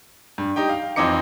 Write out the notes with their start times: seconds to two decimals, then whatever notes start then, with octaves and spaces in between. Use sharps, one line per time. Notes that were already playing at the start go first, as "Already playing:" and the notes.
0.38 G2
0.56 D#4 G4 G5
0.69 F5
0.96 F2 E3 C4 D#4 D6 C#7